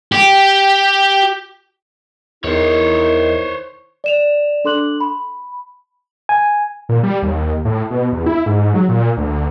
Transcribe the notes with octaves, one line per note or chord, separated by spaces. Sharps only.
G4
E2 D#3 D#4 E4 C5 C#5
D5 E7 F7
D4 A4 C6 D6 F#6 F#7
B5
G#5
A#2
G3
D#2
A2
B2
E2
E4
G#2
F#3
A#2
D2